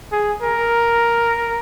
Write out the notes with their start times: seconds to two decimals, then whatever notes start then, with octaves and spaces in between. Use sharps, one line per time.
0.12 G#4
0.42 A#4